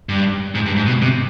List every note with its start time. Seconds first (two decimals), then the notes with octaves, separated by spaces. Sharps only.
0.09 G2
0.55 G#2
0.66 G2
0.76 G#2
0.87 B2
1.02 C3